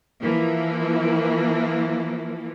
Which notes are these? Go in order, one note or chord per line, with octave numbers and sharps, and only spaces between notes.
E3 F3 A#3